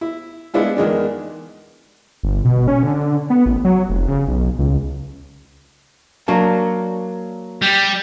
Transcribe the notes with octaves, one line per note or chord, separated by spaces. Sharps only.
E4
G#3 B3 D4 E4 F4
E2 D#3 G#3 D4
G1
B2
C#4
D3
B3
A1
F#3
F1
C#3
B1
C#2
F#3 A#3 D4
G3